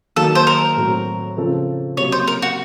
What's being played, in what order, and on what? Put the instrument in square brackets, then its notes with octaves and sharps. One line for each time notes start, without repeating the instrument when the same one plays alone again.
[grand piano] D#3 F#3 A#3 [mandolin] A4
[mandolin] C5
A#4
[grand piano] A2 F#3 C4 F#4
C#3 F3 C4 F4 A4
[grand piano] C3 F#3 A#3 C#4 [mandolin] C#5
[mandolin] C5
A#4
F#4